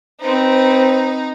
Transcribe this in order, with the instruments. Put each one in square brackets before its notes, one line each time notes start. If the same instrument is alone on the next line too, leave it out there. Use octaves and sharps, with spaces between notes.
[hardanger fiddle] C4 B4 [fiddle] D#4 [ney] C5